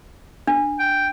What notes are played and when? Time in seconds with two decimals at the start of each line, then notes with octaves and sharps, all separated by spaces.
0.47 D4
0.79 G5